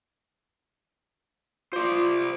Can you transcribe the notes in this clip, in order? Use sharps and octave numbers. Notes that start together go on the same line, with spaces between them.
F4 C5 D5